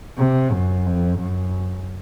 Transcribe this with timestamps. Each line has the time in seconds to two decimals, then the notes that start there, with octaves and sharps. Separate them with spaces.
0.17 C3
0.51 F#2
0.86 F2
1.19 F#2